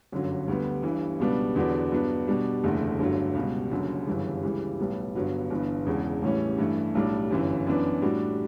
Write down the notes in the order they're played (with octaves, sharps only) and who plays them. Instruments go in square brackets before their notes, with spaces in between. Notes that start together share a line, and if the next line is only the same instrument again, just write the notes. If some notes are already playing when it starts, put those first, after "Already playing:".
[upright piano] G1 F#2 D3 F#3
D2 D3 G3 B3
G1 G2 E3
C#2 B2 G3 B3 D4
E2 D3 F#3 B3 D4
G2 F#3 B3 D4
B2 G3 D4
F#1 E2 D3 A3
G1 G2 D3 F#3 A3
C#2 B2 G3
F#1 F#2 D3 F#3
G1 F#2 C#3 E3 G3
C#2 C#3 E3 G3
B1 A2 G3 B3
G1 G2 F#3 B3
G1 G2 E3 B3
E1 E2 C#3
A1 A2 E3 G3 C#4
G2 E3 A3
B1 A2 G3 D4
G1 F#2 E3
F#2 E3 B3 D4
A2 G3 D4 F#4